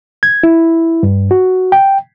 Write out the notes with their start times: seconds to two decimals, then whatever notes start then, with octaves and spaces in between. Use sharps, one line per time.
0.23 G#6
0.43 E4
1.03 G2
1.31 F#4
1.72 G5